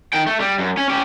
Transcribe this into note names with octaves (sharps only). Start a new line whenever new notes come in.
D#3 G5
A3
G3
F#2
C#4
C#4 G4